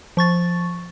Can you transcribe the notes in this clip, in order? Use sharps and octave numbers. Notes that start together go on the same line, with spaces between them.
F3 C#6 A6